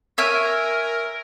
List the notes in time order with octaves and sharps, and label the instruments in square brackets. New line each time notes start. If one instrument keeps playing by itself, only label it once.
[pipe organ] A#4 [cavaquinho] C#5 E5 G#5